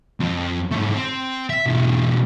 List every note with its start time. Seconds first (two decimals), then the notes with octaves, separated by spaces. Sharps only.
0.20 F2
0.71 G#2 A3
0.96 C4
1.50 E5
1.66 B1 E2